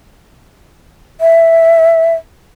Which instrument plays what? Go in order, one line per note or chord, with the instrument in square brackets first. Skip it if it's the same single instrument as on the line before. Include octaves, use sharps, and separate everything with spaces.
[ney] E5